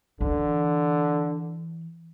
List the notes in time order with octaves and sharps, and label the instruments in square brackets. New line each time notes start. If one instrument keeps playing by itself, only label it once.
[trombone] D3 [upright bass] E3